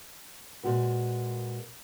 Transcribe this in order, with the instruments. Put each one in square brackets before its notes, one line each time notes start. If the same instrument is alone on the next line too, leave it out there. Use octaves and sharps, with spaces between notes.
[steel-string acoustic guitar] A#2 G#3 F#4 B4